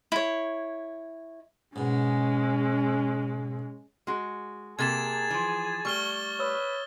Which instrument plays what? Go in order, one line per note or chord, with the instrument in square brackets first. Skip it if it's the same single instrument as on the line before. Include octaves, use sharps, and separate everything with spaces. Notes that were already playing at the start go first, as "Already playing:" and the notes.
[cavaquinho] E4 C#5
[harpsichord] G#2 B2 [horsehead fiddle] G#3 C#4
[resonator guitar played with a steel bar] G#3 F#4
[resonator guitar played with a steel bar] C3 A#3 A4 [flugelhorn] G#4 [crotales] G#6 A6 E7
[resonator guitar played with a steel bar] E3 F3
[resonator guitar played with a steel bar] G3 A3 [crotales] C#6 F6 G7
[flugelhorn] B4 [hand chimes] C#5 D#6 E6